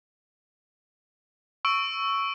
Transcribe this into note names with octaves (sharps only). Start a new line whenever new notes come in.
C#6 E6 D7